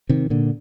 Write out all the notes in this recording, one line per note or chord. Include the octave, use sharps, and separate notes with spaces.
C3 D#3
A#2 D3